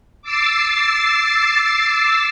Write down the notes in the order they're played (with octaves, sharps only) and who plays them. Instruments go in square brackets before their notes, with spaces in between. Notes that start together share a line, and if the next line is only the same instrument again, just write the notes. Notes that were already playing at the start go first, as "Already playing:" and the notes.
[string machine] D6 E6 A6 C7